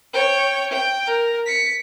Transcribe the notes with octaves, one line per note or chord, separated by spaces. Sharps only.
C#5 G5
G5
A#4
B6 C#7